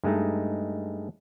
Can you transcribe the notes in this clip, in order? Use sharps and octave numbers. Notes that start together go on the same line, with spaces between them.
G2 G#3 A3 D#4